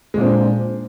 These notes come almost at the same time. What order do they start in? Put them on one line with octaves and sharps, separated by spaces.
G#3 A#2 C4 D4